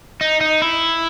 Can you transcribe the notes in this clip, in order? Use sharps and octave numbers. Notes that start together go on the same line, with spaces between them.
D#4
D#4
E4